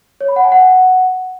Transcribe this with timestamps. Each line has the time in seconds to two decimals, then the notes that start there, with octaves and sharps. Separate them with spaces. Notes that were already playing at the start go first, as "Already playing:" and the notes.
0.21 C#5
0.28 B5
0.36 F#5
0.44 G#5
0.52 F#5